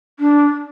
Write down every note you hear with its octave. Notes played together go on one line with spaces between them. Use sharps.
D4